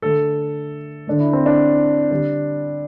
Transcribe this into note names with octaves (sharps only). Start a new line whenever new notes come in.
D3 A3 A4
D3 A3 D4
E4
C4
D4
D3 G3